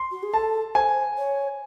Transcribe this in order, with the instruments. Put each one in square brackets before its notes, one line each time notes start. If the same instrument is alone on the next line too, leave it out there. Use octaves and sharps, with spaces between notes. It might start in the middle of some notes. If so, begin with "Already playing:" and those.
Already playing: [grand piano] C6
[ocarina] F#4
G#4
[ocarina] A4 [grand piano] A5
[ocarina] C5 [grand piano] G#5
[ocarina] C#5